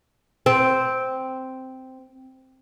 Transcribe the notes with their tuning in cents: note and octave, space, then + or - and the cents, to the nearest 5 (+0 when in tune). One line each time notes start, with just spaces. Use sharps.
C4 -5